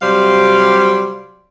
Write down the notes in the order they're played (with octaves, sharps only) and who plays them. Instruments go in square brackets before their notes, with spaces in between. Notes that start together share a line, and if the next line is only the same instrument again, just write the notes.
[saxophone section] C3 F#3 G3 C5 D5 F5